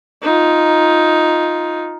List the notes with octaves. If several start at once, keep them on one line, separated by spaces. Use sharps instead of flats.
D#4 F4